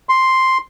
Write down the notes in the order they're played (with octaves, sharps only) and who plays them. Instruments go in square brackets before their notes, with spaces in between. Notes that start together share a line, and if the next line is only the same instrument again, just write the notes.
[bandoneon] C6